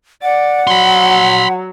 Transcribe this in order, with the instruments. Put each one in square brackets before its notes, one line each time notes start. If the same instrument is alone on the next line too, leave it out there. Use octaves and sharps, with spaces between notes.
[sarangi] D5 [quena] F#5
[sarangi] F#3 [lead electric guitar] B5 C6